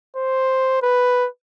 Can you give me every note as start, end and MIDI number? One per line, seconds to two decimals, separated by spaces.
0.16 0.80 72
0.82 1.28 71